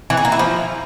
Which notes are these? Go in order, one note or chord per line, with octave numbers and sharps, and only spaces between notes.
E3
G#4
A#3
E4
F3